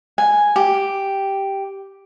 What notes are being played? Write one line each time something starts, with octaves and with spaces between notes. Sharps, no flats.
G#5
G4